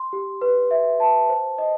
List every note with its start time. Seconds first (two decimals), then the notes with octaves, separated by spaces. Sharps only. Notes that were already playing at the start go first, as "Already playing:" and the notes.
Already playing: C6
0.13 G4
0.41 B4
0.71 E5
1.00 A5
1.29 C5
1.58 D#5